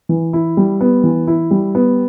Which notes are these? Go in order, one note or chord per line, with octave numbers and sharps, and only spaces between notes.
E3
E4
G3
B3
E3
E4
G3
B3